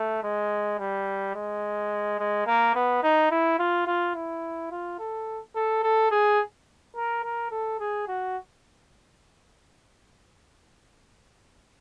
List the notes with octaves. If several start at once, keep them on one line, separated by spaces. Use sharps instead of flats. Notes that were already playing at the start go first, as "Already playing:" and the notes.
Already playing: A3
G#3
G3
G#3
G#3
A#3
B3
D#4
E4
F4
F4
E4
F4
A4
A4
A4
G#4
A#4
A#4
A4
G#4
F#4